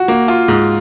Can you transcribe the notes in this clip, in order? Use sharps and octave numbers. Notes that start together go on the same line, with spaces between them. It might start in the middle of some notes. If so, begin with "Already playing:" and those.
Already playing: F#4
A#3
F4
G#2